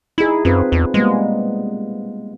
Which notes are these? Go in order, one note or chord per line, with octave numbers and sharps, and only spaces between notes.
D#4 E4 G#4
F#2 C4 F4 B4
E2
G3 G#3 A#3 B3